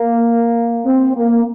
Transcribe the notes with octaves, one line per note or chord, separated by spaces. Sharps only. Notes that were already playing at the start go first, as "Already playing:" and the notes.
Already playing: A#3
C4
A#3